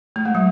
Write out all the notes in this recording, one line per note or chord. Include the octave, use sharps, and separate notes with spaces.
A3
G#3
F#3